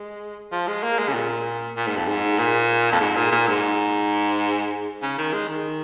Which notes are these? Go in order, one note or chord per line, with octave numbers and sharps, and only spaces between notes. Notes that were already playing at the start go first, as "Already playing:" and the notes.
Already playing: G#3
F3
G#3
A#3
G#3
C#3
A#2
A#2
G#2
F2
G#2
A#2
F2
G#2
A#2
A#2
G#2
C#3
D#3
G#3
D#3